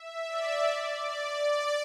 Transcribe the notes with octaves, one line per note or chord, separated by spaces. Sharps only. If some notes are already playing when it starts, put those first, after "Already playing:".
Already playing: E5
D5
D5
D5
D5